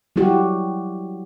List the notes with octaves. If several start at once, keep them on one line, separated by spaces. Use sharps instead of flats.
F#3 G3 E4 F#4 G4